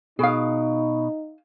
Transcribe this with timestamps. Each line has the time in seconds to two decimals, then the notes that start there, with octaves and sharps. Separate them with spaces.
0.19 B2 D#4 G#4 F5